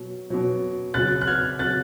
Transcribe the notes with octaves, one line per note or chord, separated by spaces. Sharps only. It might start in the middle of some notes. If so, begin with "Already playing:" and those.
Already playing: B2 F#3
B2 F#3
C#3 F#3 F#6 A6
F#6
F6 G#6
C#3 F#3 F#6 A6